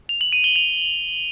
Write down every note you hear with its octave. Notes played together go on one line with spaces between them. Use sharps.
F7
F#7
D#7
G7
F7